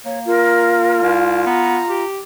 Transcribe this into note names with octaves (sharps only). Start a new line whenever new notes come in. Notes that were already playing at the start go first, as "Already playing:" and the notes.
A#3 C#5
F4 A#4
C2
B3 A#5
G4